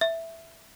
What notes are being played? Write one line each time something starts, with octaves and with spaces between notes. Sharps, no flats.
E5